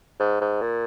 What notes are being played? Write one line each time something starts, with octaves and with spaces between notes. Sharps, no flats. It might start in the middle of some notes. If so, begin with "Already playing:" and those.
G#2
G#2
A#2